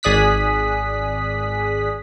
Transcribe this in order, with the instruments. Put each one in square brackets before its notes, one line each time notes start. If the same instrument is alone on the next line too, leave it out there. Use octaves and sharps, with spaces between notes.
[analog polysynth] G#1 G#4 D5 D#6 F#6 B6